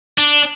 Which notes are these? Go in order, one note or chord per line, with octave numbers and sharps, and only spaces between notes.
D4